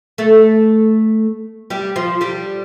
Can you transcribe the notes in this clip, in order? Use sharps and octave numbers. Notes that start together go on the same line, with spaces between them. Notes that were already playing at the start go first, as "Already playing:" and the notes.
A3 A4
G3 G4
F3 F4
G3 G4